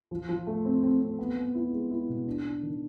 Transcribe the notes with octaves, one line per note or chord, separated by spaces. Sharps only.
F3
F3
A3
C4
C4
C4
B3
B3
E4
G#3
E4
B2
D4
D4
D#3